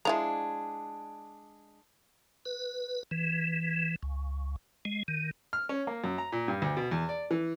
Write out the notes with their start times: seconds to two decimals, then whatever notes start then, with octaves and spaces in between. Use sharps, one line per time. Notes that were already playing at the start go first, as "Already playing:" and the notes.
0.05 F3 G#3 D4 E4 A#5
2.46 B4
3.11 E3
4.03 C#2
4.85 G#3
5.08 D#3
5.53 F6
5.69 C#4
5.87 A#3
6.04 F#2
6.18 A#5
6.32 A#2
6.48 G2
6.62 D2
6.77 B2
6.91 E2
7.09 D5
7.31 E3